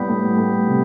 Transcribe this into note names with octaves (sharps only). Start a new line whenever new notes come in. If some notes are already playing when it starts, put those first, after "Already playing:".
Already playing: A2 G3 B3
A3
A3
C3